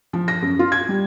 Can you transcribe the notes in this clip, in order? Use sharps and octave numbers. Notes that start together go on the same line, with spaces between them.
F3
A#6
F#2
F4
G#6
G3